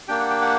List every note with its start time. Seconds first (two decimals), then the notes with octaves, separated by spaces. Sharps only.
0.08 A#3 D4 G4 G5
0.20 F#5
0.31 G5
0.41 F#5